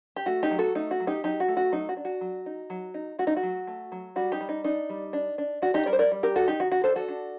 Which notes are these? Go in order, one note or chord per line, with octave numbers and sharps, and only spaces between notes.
G4
A3 F#4
D#4 G4
F#3
F#4 A4
A3 D#4
F#4
F#3
D#4 G4
F#3 D#4 G4
F#4
A3
F#4
F#3 D#4
F#4
D4
F#4
F#3
D#4
F#3
D#4
A3 F#4
D#4
F#4
F#3
A3
F#3
G3 F#4
D#4 G4
G3
D#4
D4 D#4
G3
D4
D4
D4 F#4
D#4 G4
G3 A#4 D5
C5
A#4 D5
G3
G4 A#4
D#3 F#4 A4
D#4 G4
D#3 F#4
F#4
D4 A4 C5
F#4 A4
D4